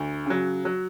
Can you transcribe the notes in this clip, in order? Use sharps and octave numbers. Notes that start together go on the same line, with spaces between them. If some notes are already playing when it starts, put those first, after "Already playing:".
Already playing: D2
C#3 F#3
F#3